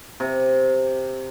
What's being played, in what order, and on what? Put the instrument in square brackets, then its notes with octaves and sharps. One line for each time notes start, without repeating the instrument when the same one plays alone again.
[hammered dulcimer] C3